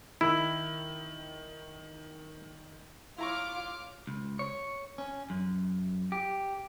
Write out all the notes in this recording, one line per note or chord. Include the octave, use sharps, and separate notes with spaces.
D#3 E4
E4 F4 C#5 A#5 C#6 D6 F6
C#2
C#5
C#4
F#2
G4